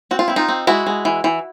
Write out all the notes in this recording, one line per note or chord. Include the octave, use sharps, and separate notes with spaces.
C4 F#4
F4
C4 E4
D#4 F4
C4
G#3 E4 F#4
G#3
E3
E3